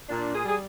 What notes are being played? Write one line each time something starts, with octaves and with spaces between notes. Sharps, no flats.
A#2 D4
G#4
G3 G#4